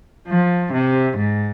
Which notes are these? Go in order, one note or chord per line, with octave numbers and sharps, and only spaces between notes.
F3
C3
G#2